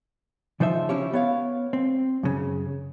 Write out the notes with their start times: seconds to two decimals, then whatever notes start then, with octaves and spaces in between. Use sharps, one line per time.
0.60 C#3 F3 D#4 C5 E5
0.89 C#4 E4 G4 C#5
1.13 B3 C#5 F5
1.73 C4
2.23 F#2 C#3